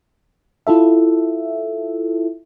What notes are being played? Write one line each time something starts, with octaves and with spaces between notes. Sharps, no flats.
E4 F4 A4 E5